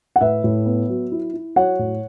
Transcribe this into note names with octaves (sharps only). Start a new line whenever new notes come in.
F#5
A2 B4 E5
A2
B3
F#3
E4
E4
F#3 C#5 F#5
A2